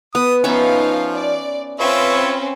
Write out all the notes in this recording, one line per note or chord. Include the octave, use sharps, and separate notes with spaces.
B3 D#6
F3 B3 C#4 D#4 E5 F5
D5
C4 C#4 F4 B4 C#5 E5